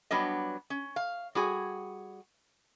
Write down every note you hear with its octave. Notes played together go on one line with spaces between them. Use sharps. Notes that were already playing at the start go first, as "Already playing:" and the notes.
F#3 G3 B3 D4 D#5
C#4
F5
G3 F#4 G#4